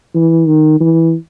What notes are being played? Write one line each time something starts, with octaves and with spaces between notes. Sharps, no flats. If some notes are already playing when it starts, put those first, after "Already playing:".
E3
D#3
E3